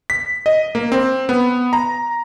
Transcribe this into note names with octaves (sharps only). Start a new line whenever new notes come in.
B6
D#5
A#3
C4
B3
A#5